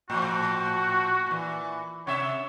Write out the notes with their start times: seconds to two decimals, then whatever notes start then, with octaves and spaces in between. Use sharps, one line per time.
0.10 A2 F3 F#4
1.26 A#2 E3
2.07 C3 C#5 E5